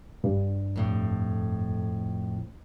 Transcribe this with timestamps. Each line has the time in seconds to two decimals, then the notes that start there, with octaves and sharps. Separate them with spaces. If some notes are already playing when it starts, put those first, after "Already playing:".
0.24 G2
0.76 F2 A2